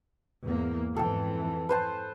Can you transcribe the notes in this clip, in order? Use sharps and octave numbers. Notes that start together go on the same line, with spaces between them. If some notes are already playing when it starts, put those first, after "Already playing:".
E2 G#2 A#3
F2 G#2 E3 A4 G5
B4 C5 A5